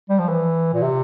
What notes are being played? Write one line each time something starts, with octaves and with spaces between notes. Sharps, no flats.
G3
F3
E3
A#2
C3